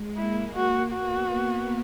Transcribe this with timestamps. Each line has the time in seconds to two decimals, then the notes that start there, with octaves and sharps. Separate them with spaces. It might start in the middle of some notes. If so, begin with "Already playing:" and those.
Already playing: G#3
0.17 A#3 E4
0.55 F#4
0.93 B3 F#4